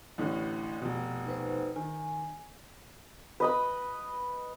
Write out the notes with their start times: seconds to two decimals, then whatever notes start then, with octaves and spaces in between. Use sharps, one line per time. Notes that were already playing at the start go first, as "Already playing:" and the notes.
0.18 A1 A2 D3
0.81 F1 B2
1.26 D#4 B4 C5
1.76 D#3 G#5
3.40 B4 D#5 B5